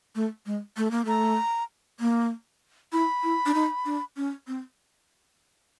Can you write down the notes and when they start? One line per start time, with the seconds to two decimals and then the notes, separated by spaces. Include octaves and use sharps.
0.15 A3
0.46 G#3
0.77 A3
0.91 A#3
1.05 A3 A#5
2.00 A#3
2.93 E4 B5
3.24 E4
3.46 D4
3.54 D#4
3.86 D4
4.17 C#4
4.47 C4